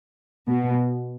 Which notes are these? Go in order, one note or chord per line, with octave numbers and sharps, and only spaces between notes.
B2